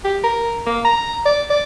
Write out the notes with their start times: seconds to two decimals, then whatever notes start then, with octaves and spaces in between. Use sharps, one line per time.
0.04 G4
0.24 A#4
0.67 A#3
0.85 A#5
1.26 D5
1.50 D5